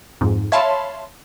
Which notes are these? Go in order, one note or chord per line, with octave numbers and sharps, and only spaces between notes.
F2 G#2
C#5 E5 F5 A5 B5 C6